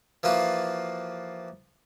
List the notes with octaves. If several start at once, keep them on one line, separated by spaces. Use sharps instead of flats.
E3 F3 A#3 F4 F#4